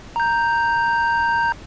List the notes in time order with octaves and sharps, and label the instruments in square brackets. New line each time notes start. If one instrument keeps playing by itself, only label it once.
[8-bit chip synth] A#5 G6